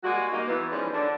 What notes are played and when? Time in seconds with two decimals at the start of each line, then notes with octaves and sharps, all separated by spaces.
0.03 G3 G#3 A#3 F#4
0.32 A#3 D#4
0.47 E3 B3
0.71 E3 F3 G3 G#3 C#4 D#4
0.93 D3 D4